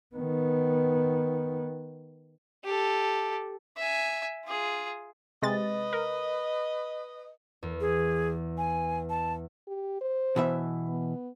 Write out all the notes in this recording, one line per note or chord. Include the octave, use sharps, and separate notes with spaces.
D#3 B3
G4 A4
E5 G#5
F4 G#4
C3 G#3 B4 D#5 A6
A#4
E2
G#4
G#5
A5
G4
C5
B2 E3 E5
B3